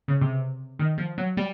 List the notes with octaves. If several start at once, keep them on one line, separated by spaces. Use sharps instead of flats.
C#3
C3
D#3
F3
F#3
G3